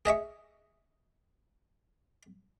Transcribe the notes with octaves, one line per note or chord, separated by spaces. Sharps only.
G#4 D#5 E5 C#6